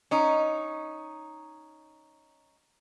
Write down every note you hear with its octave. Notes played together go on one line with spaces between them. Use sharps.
C#4 D#4